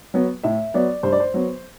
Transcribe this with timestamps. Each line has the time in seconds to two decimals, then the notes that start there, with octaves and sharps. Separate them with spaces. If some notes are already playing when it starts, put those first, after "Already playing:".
0.14 F#3 B3
0.43 A2 E5
0.74 F#3 B3 D5
1.03 G2 C5
1.12 D5
1.20 C5
1.34 F#3 B3